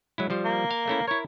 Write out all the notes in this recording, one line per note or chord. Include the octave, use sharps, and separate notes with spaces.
F#3 G#3 E4
F3 G3 C5
A#3
F5
A3 C#4 E4
E4 A#4 C#5